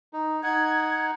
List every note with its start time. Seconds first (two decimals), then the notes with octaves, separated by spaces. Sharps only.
0.13 D#4
0.43 D#4 F#5 G#6